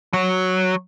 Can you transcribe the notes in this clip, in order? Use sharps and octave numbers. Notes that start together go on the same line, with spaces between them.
F#3